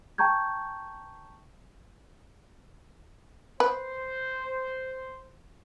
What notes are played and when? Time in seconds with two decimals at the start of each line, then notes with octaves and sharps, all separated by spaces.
0.18 G5 A5 A#5 C#6 G6 G#6
3.60 B4 C5